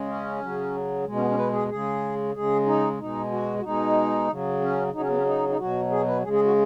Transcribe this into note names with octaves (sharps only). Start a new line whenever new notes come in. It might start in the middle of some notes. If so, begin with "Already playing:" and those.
Already playing: C#3 G#3
C#4
C#3 F#3
B2 G#3
C#4
B3
C#4
B4
G#4
C#3 G#3 G#4
C#3 G#3 G#4
D#4
B2 G#3 D#4
F#4
F#4
B2 G#3 D#4
C#3 F#3
C#4
C#3 F#3 D#4
C#4
B3
C#4
D#4
D#4
B2 F#3 F#4
G#4
B4
C#3 G#3 G#4
G#4
F#4